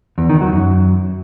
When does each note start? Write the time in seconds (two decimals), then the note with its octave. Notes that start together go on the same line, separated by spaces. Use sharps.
0.18 E2
0.29 D#3
0.41 F#3
0.53 F#2